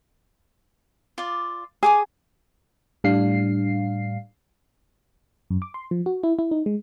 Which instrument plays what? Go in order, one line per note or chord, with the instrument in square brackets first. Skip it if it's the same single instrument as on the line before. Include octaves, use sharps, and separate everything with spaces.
[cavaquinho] F4 D5
[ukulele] G#4 [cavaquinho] G#5 D6 D#6
[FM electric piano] A2 G3 D4 F5 C7
F#2
D6
C6
F3
F#4
E4
E4
D#4
G#3